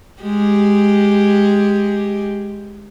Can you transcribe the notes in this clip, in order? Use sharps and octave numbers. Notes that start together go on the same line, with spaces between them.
G#3 G4